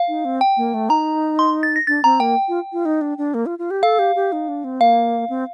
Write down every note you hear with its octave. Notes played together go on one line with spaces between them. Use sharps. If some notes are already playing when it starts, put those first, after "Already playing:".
Already playing: F5
D#4
C4
G5
A#3
A3
D#4 A#5
C6
A6
A#6
D4 A6
C4 A#5
A#3 G5
F4
F4
D#4
D4
D4
A#3
F4
F4
G4
A4 F5
G4
G4
D#4
D4
C4
A#3 F5
C4